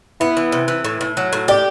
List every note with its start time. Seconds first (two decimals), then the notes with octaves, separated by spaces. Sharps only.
0.20 B3 E4
0.37 E3
0.52 C3
0.68 E3
0.84 A2
1.01 A2
1.17 F#3
1.33 A2
1.48 G4 D5